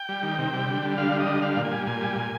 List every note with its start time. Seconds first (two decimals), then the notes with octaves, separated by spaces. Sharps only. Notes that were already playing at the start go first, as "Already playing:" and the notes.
Already playing: G5
0.09 G3
0.23 D#3
0.38 C3
0.53 G3
0.68 D3
0.82 G3
0.97 D3 F5
1.12 G3
1.20 D#5
1.26 D3
1.42 G3 F5
1.57 A#2
1.65 G#5
1.71 G3
1.86 A#2 G#5
2.01 G3
2.15 A#2